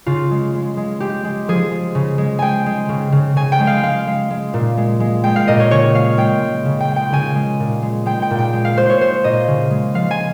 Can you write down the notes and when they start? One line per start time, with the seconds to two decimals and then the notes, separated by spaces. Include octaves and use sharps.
0.06 C#3 F4
0.31 G#3
0.54 G#3
0.77 G#3
1.00 G#3 G4
1.24 G#3
1.48 F3 G#4
1.71 G#3
1.95 C#3
2.18 G#3
2.39 G#3 G5 G#5
2.66 G#3
2.89 C#3
3.12 C#3
3.36 C#3 G#5
3.52 G5
3.60 G#3
3.67 F5
3.83 G#3 F5
4.07 G#3
4.30 G#3
4.54 A#2
4.77 G#3
5.00 G#3
5.24 G#3 G5
5.36 F5
5.47 A#2 D#5
5.60 C#5
5.71 C#3 C#5
5.95 G#3 F5
6.17 G#3 G5
6.42 G#3
6.65 C#3
6.80 G5
6.89 G#3
6.96 G5
7.12 C#3 G#5
7.35 G#3
7.60 A#2
7.82 G#3
8.06 G#3 G5
8.22 G5
8.31 A#2
8.38 G5
8.53 G#3
8.65 F5
8.77 G#3 C5
8.89 C#5
9.01 G#3 C5
9.24 A#2 D#5
9.48 C#3
9.71 G#3
9.94 F3 F5
10.11 G#5